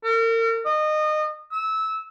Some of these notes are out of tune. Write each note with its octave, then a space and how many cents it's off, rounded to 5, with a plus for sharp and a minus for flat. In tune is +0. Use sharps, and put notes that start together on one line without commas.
A#4 -40
D#5 -25
E6 -20